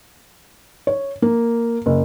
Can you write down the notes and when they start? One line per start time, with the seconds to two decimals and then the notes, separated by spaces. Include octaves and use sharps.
0.87 C#5
1.22 A#3
1.86 F#1